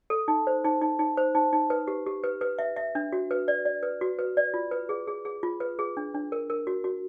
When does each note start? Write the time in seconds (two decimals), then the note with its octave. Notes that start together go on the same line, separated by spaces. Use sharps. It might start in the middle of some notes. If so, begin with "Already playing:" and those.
0.10 A4
0.28 D#4
0.47 C5
0.64 D#4
0.82 D#4
0.99 D#4
1.17 C5
1.35 D#4
1.53 D#4
1.70 B4
1.88 G4
2.06 G4
2.23 B4
2.41 B4
2.59 E5
2.76 E5
2.95 D4
3.13 F#4
3.31 B4
3.48 D5
3.65 D5
3.83 B4
4.01 F#4
4.19 B4
4.37 D5
4.54 F4
4.71 B4
4.89 G#4
5.07 G#4
5.25 G#4
5.43 F4
5.60 B4
5.79 G#4
5.97 D4
6.15 D4
6.32 A#4
6.50 A#4
6.67 F#4
6.84 F#4